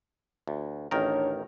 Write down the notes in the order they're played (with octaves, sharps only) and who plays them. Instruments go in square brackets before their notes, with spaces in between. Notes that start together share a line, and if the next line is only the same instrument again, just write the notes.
[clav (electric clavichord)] D2
[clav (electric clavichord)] A1 D#3 A#4 [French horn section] D2 D4 C#5